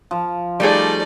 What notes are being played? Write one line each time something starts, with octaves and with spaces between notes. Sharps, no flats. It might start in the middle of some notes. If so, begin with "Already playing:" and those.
F3
G3 A3 D#4 G#4 D5